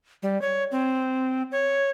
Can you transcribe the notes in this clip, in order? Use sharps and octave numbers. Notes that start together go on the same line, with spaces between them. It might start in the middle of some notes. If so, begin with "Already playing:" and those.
G3
C#5
C4
C#5